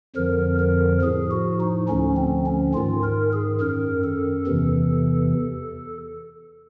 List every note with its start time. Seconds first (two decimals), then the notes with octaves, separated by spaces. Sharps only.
0.16 F2 D3 F3 A#4
0.59 A#4
1.02 A2 F3 G#4
1.31 F#4
1.60 D#4
1.89 D2 D3 F3 C#4
2.17 C4
2.46 C#4
2.74 G#2 D#3 F4
3.03 A#4
3.33 G#4
3.61 F#2 D#3 A#4
4.04 A4
4.47 E2 C3 E3